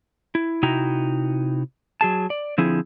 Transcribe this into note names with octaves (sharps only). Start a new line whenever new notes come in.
E4
C3 D#4 E4 F#4 G5 A#5
F#3 G#4 A5
D5
D3 F3 C4 E4 G#4